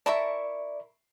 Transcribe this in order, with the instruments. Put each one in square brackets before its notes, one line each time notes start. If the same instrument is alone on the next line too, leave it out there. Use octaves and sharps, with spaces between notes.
[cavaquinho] E4 A#4 C#6 [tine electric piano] D5 [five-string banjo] E5 A5